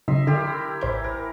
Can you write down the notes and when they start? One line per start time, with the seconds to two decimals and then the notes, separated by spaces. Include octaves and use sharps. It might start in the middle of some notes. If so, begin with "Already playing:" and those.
0.08 C#3 F#3 D#4 D#5 E5 C6
0.27 D3 E4 G4 A#4
0.81 A1 E3 C5 G6
1.04 A#4